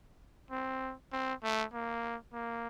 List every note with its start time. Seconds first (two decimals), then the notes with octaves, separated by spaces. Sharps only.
0.51 C4
1.13 C4
1.43 A3
1.73 A#3
2.34 A#3